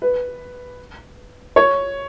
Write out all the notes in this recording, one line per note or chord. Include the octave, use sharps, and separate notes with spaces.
B4
C#5